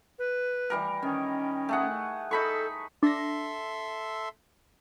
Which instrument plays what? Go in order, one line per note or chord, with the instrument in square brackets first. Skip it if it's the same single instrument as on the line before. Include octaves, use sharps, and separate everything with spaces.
[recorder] B4
[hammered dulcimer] E3 G3 A#4
[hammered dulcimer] D#3 [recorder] C#4
[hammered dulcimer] A3 G#4 F#5
[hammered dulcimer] D#4 B5 C#6 [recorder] A4
[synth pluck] D4 A#6 [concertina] A4 E5 C6